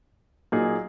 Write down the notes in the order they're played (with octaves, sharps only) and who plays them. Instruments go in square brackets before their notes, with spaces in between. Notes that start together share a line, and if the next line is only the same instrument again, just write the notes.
[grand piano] A#2 F#3 A#3 D#4 G#4